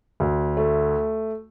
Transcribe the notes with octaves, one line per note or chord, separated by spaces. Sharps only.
D2
A3